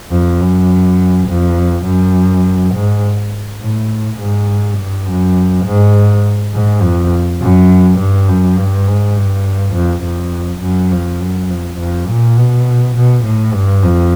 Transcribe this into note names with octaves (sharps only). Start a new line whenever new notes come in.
F2
F#2
F2
F#2
G#2
A2
G#2
G2
F#2
G#2
G#2
F2
F#2
G2
F#2
G2
G#2
G2
F2
F2
F#2
F2
F#2
F2
F2
A#2
B2
B2
A2
G2
F2